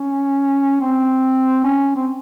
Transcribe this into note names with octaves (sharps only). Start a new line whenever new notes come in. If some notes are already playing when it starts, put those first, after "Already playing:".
Already playing: C#4
C4
C#4
C4